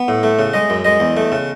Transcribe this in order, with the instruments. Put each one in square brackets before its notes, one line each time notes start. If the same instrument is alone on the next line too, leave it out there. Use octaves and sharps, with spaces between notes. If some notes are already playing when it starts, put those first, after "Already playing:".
Already playing: [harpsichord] B3
A2
A3
C#3
G#3 D#5
F#2
G#3 D#5
E2
A3
C#3